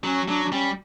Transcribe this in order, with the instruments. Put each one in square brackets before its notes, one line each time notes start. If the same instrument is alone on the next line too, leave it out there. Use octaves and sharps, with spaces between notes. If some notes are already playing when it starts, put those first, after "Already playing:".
[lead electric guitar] F#3 [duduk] C#4
[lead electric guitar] F#3 [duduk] D4
[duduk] D4
[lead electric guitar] G3 [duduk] C#4